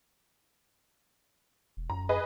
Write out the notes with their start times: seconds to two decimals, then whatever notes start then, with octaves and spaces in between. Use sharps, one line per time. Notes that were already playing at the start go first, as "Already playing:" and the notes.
1.77 E1
1.90 F#2 A#5
2.09 G#4 B4 D#5